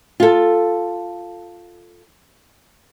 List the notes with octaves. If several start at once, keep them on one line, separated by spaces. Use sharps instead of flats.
F4 A4